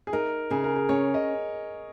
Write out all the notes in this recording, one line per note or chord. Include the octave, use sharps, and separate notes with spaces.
G#4
D#4 A#4
C#3 G#4
A#4
G#4
C#4 C#5
D#5